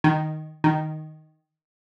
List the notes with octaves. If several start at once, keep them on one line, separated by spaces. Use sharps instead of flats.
D#3
D#3